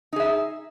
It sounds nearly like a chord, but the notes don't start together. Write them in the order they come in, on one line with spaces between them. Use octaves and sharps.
D#4 G#4 E5